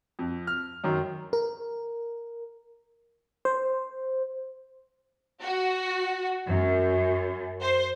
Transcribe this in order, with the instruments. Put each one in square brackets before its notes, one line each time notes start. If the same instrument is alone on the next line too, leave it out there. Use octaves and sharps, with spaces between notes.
[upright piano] F2
F6
F#2 D#3
[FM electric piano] A#4
C5
[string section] F#4
F#2
C5